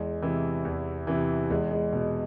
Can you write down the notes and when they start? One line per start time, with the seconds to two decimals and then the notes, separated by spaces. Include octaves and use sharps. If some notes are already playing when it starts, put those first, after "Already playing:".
Already playing: E2 G#3
0.22 C3 E3
0.65 E2
1.07 C3 E3
1.50 E2 G#3
1.71 G#3
1.93 B2